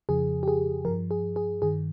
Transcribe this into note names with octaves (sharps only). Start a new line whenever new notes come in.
F2 C#3 F3 G#4
G4
G#4
G2 F3 A#4
G#4
G#4
G2 D#3 G#4